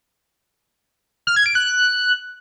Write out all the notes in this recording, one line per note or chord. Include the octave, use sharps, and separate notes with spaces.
F6
G#6
D7
F#6